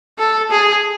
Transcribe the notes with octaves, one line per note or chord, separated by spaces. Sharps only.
A4
G#4